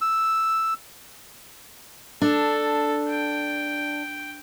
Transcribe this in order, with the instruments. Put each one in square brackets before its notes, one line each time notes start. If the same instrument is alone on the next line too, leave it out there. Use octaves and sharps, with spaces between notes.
[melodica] E6
[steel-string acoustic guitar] D4 [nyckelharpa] A4
[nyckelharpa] G5